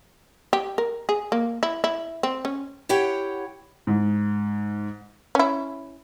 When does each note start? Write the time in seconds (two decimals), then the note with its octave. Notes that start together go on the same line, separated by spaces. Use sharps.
0.53 G4
0.78 A#4
1.09 G#4
1.32 A#3
1.63 E4
1.84 E4
2.23 C4
2.45 C#4
2.89 E4 G4 C#5 F#5 G5
3.87 G#2
5.35 C#4 E4